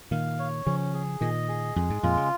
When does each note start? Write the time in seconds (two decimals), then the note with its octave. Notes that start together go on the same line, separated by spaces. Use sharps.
0.11 A#2 D#3 F5
0.39 C#5
0.66 C#3 F3 C#4
0.94 G#4
1.21 A#2 D#3 D#5
1.48 G#4
1.76 F2 G#3
1.90 G#2
2.03 F2 A#2 F4
2.17 C#3